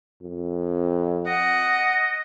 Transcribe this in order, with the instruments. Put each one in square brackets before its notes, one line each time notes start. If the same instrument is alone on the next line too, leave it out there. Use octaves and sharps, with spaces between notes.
[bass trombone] F2
[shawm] D#5 [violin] F#5